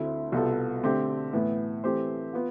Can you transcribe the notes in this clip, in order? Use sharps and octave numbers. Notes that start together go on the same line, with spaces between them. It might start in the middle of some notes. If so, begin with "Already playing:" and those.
Already playing: D2 D3 A3 C4 E4
C2 B2 B3 F4 A4
D3 A3 C4 G4
A2 E3 B3
E3 A3 C4 G4 C5
B3 F4